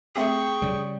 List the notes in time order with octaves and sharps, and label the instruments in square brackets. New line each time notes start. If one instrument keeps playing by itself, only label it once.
[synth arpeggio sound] A3 C4 G4 [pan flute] G#4 [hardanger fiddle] G5 C#6
[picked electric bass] C#3 G3